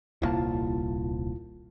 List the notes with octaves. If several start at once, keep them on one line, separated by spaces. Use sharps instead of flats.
D#1 C2 A#3 E4 F4 A5